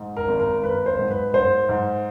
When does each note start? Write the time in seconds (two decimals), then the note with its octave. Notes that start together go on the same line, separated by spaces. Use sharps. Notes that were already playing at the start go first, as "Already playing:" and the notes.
Already playing: G#2
0.17 A#4
0.28 G#1
0.40 A#4
0.63 G#1 B4
0.86 C5
0.99 G#2
1.10 B4
1.33 G#2 C5
1.69 G#2